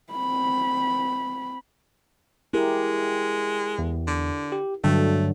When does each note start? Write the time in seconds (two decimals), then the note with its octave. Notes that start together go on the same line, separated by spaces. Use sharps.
0.12 C4 B5
2.54 G#3 E4 G4 A#4
3.79 E2
4.07 D3
4.52 G4
4.84 G2 D3 F#3 A3